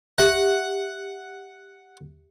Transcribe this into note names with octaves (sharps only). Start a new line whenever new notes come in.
G4 E5 F#5